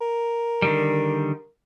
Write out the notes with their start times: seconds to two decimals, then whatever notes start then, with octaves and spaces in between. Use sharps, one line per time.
0.01 A#4
0.62 D3 D#3 G3